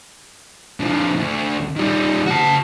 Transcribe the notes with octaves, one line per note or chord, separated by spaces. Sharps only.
D3 F3
D2
D#3 G3
F#4 A5